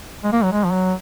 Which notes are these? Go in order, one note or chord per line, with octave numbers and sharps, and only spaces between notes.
G#3
A#3
F#3
G#3
F3
F#3